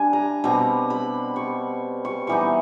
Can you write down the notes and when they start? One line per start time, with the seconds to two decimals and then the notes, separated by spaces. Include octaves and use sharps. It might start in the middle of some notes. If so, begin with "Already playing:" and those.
Already playing: D3 G3 D4 G#5
0.13 A#5
0.44 B2 G3 C4 A#5
0.90 B5
1.36 C#6
2.05 C#6
2.27 E3 G3 B3 D#4 C#6